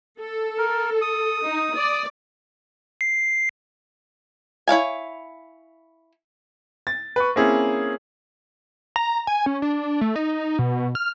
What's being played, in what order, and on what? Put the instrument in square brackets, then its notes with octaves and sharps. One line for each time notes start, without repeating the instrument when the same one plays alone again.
[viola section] A4
[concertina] A#4
D#6
[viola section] D#4
D5
[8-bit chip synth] C7
[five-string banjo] E4 C#5 F5 G#5
[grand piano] A6
B4 C#6
A#3 C4 C#4 E4 G#4
[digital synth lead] A#5
G#5
C#4
D4
A3
D#4
B2
F6